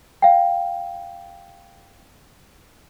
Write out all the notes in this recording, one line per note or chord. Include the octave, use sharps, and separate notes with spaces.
F5 G5